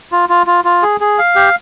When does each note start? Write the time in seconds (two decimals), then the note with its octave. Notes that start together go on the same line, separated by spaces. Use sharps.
0.12 F4
0.29 F4
0.47 F4
0.65 F4
0.83 G#4
1.01 G#4
1.18 F5
1.36 G4